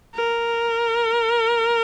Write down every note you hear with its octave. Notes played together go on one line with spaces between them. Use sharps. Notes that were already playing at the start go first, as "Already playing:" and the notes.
A#4